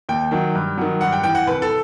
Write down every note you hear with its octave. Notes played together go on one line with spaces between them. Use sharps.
D#2 G5
D#3 F#3
G2
D#3 F#3
G2 F#5
G5
E3 G5
F#5
C2 B4
A4